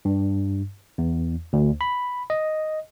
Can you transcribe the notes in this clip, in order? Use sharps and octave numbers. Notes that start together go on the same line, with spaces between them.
G2
E2
D2
B5
D#5